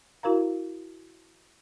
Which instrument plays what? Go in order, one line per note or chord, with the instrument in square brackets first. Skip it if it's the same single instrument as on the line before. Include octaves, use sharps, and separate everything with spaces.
[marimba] E4 F#4 A#4 F5 A#5